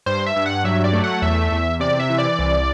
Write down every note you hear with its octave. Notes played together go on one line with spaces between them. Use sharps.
G2 C5
E5
G2
F#5
F#3 E5
D5
A3
F#5
E2 E5
E2
C3 D5
E5
E3
D5
C2